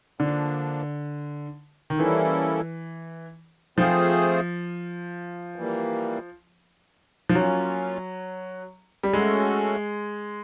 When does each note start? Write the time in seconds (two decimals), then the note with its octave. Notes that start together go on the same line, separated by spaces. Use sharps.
0.20 D3 F3 A#3 D4
1.90 D#3
1.98 E3 G3 A#3 C#4 E4 A4
3.78 F3 A3 C4 F4 G#4 C5
5.56 E3 G3 A#3
7.29 F3
7.35 F#3 A#3 C#4 F4
9.03 G3
9.13 G#3 A3 C#4 F#4 A4